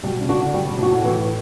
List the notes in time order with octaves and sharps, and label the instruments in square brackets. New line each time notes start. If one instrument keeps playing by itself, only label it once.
[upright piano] B2 [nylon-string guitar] G3
[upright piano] C#3
[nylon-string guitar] D4 F#4
[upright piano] D3
[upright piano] D3 [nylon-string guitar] G3
[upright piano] B2
[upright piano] B2 [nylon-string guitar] D4 F#4
[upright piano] A2
[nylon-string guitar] E3